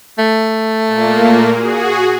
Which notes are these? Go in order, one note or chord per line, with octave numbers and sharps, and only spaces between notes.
A3
A#2 A#3
F#4 G#4